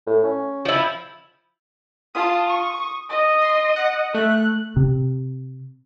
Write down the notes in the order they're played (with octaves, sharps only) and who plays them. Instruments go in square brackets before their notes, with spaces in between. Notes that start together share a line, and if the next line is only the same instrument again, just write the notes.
[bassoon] A2
C#4
[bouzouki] F3 E4
[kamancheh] F4 A5 [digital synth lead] D#6
[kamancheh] C#6
D#5
[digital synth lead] C6
F#5
[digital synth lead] A3 [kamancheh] F#6
[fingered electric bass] C3